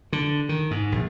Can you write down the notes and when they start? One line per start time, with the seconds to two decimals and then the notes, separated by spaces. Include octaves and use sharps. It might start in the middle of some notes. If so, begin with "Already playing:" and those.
0.13 D3
0.49 D#3
0.71 G#2
0.92 A#1